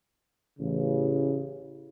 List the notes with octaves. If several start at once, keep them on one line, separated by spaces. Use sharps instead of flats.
A1 C#3